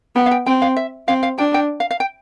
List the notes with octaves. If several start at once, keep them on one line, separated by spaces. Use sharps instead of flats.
B3 G5
F5
G5
C4 G5
F5
E5
C4 F5
F5
D4 G5
G5
F5
F5
G5